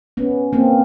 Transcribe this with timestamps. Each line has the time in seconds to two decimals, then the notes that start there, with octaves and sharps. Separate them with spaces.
0.17 B3 C#4
0.53 A#3 C4